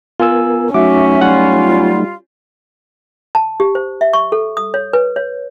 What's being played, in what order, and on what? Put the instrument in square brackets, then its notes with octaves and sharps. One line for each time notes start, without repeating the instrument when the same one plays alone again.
[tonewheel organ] B3 A#4 [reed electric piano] F4 G#5 E6
[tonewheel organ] F#3 A3 D#4 [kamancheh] C#4 [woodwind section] F#4 E5 [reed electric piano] D6
[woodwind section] G3 F4 [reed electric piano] F#5
[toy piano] A5
G4
C5
E5
C#6
A4
D#6
C#5
B4
C#5